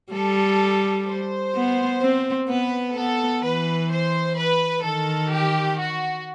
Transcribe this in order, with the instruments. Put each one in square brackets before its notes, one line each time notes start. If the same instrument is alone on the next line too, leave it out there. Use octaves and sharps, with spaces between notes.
[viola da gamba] G3 [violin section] A4
[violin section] C5
[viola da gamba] B3
C4
[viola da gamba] B3 [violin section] B4
[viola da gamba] B3 [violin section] A4
[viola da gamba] E3 [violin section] B4
[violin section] C5
B4
[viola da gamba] D#3 [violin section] A4
[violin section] G4
F#4